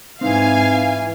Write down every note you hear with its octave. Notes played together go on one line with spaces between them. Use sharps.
G#2 E3 C4 D#4 F5 G#5